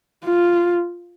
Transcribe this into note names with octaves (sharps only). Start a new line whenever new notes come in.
F4